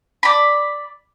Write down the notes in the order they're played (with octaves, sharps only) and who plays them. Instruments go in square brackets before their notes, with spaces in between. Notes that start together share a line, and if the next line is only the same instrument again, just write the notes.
[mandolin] D5 B5